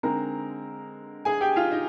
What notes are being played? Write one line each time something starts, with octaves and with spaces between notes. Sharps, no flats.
D3 G#3 C4 D#4 A#4 A#5
G#4 G#5
G4 G5
F4 F5
D#4 D#5